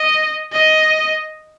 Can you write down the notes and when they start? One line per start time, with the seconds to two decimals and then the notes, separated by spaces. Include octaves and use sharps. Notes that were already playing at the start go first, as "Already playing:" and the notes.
Already playing: D#5
0.53 D#5